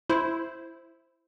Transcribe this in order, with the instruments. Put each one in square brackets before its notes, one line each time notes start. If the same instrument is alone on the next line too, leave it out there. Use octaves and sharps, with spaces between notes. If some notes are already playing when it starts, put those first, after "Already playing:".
[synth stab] E4 C5